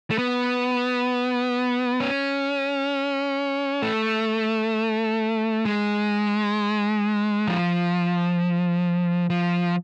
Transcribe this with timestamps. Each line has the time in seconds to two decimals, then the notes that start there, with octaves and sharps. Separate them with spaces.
0.10 A3
0.18 B3
2.00 C#4
3.82 A3
5.65 G#3
7.48 F3
9.30 F3